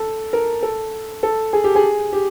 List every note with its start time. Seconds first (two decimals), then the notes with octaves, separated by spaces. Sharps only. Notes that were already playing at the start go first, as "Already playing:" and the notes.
Already playing: A4
0.33 A#4
0.63 A4
1.23 A4
1.53 G#4
1.64 G4
1.75 G#4
2.13 G4